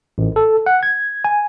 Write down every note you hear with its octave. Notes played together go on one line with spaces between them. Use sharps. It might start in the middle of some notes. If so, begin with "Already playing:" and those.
A1
A4
F#5
G#6
G#5